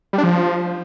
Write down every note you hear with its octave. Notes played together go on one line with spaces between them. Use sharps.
G3
D4
F3